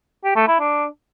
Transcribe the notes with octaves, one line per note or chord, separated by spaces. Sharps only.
G4
A3
E4
D4